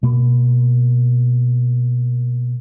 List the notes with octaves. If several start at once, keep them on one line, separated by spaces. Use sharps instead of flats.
B2 A#3